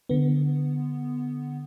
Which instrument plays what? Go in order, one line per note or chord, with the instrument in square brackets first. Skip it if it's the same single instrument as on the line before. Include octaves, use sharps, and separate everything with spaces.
[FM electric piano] D3 B3